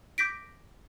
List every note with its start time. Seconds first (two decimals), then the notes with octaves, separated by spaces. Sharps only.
0.18 D6 G6 A#6 B6 D7